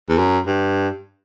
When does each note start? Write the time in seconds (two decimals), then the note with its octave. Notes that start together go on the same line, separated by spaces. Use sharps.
0.09 E2
0.18 F#2
0.47 G2